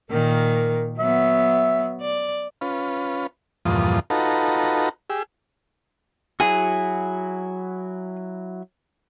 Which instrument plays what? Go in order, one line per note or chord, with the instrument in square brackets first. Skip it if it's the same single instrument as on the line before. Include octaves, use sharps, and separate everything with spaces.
[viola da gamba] A#2 D#3 [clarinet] A#4
[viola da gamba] F#3 B3 [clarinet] E5
[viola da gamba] D5
[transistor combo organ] C#4 F4 B4
E2 G2 A#2 F3 F4 D#6
D#4 F4 F#4 A4 B4 A#5
G4 G#4 E6
[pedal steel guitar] F#3 E4 F#4 [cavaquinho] G#4